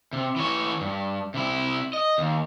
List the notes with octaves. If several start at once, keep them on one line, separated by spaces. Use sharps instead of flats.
C3
E3 C#5
G2
C3 E4
D#5
D#2